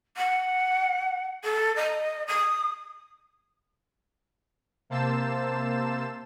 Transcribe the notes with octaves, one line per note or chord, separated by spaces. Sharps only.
F#5
A4
D#5
D#6
C3 A#3 C5 A5 E6 E7